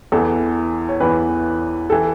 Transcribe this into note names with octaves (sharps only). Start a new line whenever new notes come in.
E2 E3 A4
C#5
E2 E3 B4
E3 A4